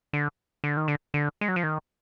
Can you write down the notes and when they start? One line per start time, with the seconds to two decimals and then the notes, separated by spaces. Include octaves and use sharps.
0.13 D3
0.64 D3
0.77 D#3
0.88 D3
1.14 D3
1.41 G#3
1.48 F#3
1.56 F3
1.63 D#3